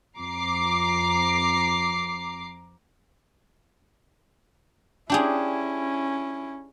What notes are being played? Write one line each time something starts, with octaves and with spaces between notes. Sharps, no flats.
F2 A#5 D6 C7
C#4 D4 E4 G4 G#4